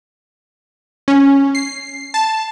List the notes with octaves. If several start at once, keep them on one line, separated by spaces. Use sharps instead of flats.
C#4
C7
A5